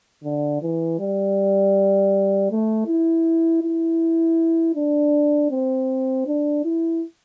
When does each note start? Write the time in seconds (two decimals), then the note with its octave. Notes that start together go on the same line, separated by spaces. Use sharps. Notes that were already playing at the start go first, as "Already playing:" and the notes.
0.24 D3
0.62 E3
0.99 G3
2.51 A3
2.87 E4
3.63 E4
4.75 D4
5.51 C4
6.27 D4
6.64 E4